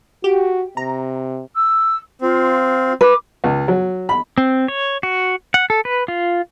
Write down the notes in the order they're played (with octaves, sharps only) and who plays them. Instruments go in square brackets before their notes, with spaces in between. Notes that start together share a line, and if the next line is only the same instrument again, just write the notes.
[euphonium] F#4 [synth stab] G4
[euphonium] C3 [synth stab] A#5
[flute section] E6
[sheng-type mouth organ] C4 [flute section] F4
[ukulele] B4 [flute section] D6
[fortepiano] C#2
F#3
B5
[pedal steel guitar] C4
C#5
F#4
F#5
A4
B4
F4